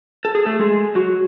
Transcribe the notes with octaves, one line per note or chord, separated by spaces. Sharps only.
A4
G#4
A3 A4
G#3 G#4
F#3 F#4